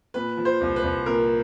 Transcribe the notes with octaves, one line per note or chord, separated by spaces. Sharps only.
A#2 B4
F3
C5
C2
B4
C2
A#2 A#4